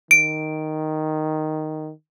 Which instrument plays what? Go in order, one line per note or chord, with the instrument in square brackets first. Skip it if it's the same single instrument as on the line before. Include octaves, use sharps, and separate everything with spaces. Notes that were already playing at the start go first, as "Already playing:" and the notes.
[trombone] D#3 [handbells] D7